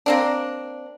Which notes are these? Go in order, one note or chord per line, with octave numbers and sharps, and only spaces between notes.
A#3 C4 D4